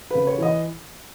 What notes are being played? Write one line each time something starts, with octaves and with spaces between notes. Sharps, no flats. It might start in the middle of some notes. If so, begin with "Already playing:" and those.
C#3 B4
C#5
E3 D#5